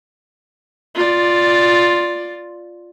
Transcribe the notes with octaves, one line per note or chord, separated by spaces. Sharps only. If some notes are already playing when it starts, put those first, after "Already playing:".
F4 D5